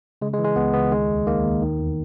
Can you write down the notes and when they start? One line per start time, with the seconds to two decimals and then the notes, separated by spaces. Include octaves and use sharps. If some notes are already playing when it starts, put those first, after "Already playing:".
0.22 C#3 G#3
0.34 G#3
0.38 E3
0.45 G#3
0.56 C#2 B3
0.74 C#2 B3
0.92 D#3 G#3
1.09 D#2
1.27 D#3 A#3
1.44 D#2
1.62 D#3
1.79 E2